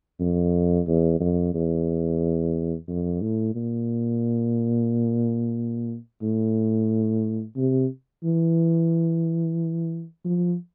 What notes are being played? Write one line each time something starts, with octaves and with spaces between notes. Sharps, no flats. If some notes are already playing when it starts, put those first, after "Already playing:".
F2
E2
F2
E2
F2
A2
A#2
A2
C3
E3
F3